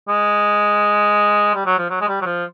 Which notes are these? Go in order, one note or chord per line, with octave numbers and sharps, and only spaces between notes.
G#3
G3
F#3
F3
F#3
G#3
G3
F#3
F3